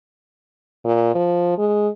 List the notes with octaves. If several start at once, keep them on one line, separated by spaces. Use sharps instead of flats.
A#2
F3
G#3